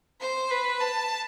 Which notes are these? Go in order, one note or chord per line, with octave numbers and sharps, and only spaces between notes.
C5
B4
A5